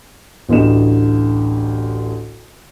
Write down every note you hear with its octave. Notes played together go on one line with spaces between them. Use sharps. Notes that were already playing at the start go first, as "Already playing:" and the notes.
A1 D2 D#5 E7